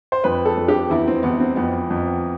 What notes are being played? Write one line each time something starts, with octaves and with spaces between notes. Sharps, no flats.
C5
F2 B4
A4
F2
G4
E2 E4
C4
E2 B3
C4
F2 B3
F2